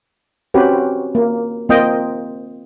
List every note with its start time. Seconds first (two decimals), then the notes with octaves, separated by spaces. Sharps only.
0.54 C4 C#4 F#4 G4 B4
1.15 A#3
1.69 A#3 C4 F4 D#5 G5